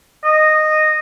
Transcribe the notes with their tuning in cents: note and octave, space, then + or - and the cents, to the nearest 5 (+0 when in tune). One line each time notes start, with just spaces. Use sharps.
D#5 -10